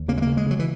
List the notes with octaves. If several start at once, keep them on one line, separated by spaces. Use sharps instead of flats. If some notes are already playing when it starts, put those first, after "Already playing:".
Already playing: D#2
C#3 A#3
G#3
C#3 A#3
G#3
C#3 F#3
E3